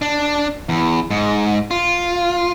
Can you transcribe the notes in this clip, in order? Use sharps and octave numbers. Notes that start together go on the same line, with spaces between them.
D4
E2
G#2
F4